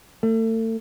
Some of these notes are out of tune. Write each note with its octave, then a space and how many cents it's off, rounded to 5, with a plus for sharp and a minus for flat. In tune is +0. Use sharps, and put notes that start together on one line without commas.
A3 +35